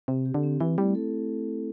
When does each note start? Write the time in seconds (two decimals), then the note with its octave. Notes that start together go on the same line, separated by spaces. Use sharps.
0.08 C3 C4
0.26 G4
0.34 D3
0.43 C4
0.60 E3 E4
0.78 G3 A3
0.95 A4